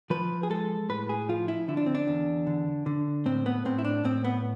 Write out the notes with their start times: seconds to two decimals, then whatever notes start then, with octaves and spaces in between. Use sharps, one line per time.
0.10 F3 B4
0.43 G#4
0.50 G#3 A4
0.89 A2 B4
1.09 G#4
1.29 F3 F4
1.48 E4
1.68 D3 E4
1.77 D4
1.86 C4
1.95 D4
2.07 E2
2.47 D3
2.86 D3
3.26 A2 C4
3.46 B3
3.65 A2 C4
3.78 E4
3.85 D4
4.04 A2 C4
4.24 B3